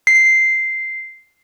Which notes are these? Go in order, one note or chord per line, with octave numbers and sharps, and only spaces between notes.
C7